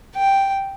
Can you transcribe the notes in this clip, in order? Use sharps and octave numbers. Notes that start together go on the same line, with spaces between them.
G5